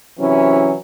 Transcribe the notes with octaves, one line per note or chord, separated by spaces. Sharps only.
C3 E3 F#3 C#4 E4